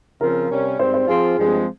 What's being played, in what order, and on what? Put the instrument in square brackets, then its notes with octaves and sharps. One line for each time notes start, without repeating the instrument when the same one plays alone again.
[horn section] C#3 F3 C4 F4 [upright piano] A#4
[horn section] C3 G3 C#4
[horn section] G#2 G3 C4 [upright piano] C5
[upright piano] C5
[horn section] F3 C4 F4 [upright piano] G#4
[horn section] G2 F3 G#3 C4